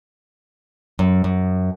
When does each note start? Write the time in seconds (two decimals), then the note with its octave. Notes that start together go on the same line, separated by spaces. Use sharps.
0.99 F#2
1.24 F#2